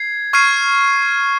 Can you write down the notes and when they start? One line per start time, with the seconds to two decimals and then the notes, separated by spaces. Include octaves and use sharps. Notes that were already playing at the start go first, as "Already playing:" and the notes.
Already playing: G#6 C7
0.33 C#6 F6 G#6 C7 D#7